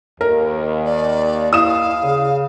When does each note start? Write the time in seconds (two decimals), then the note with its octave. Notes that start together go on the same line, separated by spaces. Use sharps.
0.21 D#2 A#4
0.85 D5
1.53 E4 F5 D#6 E7
2.03 C#3